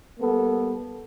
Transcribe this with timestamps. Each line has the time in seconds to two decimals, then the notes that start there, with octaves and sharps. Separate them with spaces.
0.18 G3 A#3 B3 A4